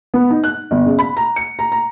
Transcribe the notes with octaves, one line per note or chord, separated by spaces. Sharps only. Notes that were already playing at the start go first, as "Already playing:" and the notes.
B3
D#4
F#6
G1
C#3
B5
A#5
C#7
A#5
A#5